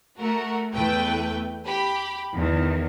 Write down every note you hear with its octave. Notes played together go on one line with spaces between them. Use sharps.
A3 F#4 A#4
E2 A3 B4 G5
G4 B5
E2 D#3